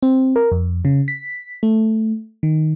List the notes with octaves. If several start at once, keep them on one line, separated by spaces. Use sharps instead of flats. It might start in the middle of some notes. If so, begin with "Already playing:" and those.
C4
A#4
F2
C#3
B6
A3
D#3